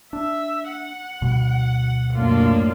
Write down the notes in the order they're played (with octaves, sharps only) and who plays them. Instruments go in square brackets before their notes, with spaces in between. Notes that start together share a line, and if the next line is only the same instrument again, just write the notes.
[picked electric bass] D4 [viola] E5
[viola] F#5
[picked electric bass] D2 B2 G3
[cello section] F#2 A2 D4 [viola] A#3 F4